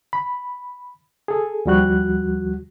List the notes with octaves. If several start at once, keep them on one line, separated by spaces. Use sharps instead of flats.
B5
G#4 A4
D#2 F3 G3 F#4 F#6